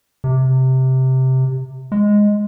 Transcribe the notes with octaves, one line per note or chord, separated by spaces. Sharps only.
C3
G#3